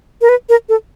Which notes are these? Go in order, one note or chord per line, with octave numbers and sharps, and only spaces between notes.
A#4
B4
A#4
A4